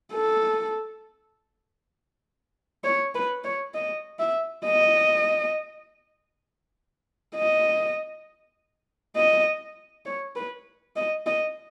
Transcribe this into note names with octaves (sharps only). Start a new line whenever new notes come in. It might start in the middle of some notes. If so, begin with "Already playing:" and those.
A4
C#5
B4
C#5
D#5
E5
D#5
D#5
D#5
C#5
B4
D#5
D#5